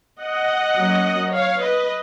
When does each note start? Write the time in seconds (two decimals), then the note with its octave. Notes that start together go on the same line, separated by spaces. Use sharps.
0.20 D#5 F#5
0.77 F#3 A#3 C#4
1.33 C#5 F5
1.62 B4 D#5